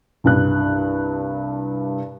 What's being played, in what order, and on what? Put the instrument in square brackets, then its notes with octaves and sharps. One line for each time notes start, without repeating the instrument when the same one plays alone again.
[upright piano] C2 G2 F#6